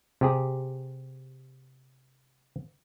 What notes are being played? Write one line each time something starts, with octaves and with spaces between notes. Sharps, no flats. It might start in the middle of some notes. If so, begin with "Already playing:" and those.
C3 G4 G#4